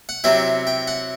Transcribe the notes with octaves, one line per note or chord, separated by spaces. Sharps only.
F#5
C3 F#3 C4 E4 G5
G5
F#5